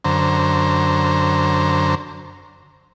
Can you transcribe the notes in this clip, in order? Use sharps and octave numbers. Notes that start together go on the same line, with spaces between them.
F#2 D3 C5 A#5